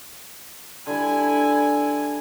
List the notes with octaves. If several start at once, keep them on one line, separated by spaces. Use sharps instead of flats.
D3 G3 E4 G#5